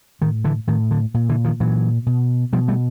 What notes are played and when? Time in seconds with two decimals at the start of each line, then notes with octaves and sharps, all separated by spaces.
0.21 A2 D#3
0.44 D3 E3
0.67 A2 D#3
0.91 D3
1.14 A#2
1.29 D3 E3
1.44 D#3 F3
1.60 A#2 E3 F#3
2.06 B2
2.53 B2 F3 G3
2.68 G3 A3